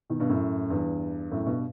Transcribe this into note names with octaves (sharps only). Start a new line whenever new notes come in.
B2 D#3
G2 B2
F#2 A2
E2 G2
F#2 A2
G2 B2